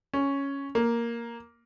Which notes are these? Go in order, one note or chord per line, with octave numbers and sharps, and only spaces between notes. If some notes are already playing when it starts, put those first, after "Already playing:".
C#4
A#3